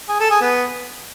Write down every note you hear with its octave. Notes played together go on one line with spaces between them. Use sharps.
G#4
A4
G#4
B3